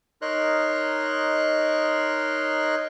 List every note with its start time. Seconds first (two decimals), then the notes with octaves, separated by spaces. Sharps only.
0.22 D#4 A#4 C#5 D#5 C6 F#6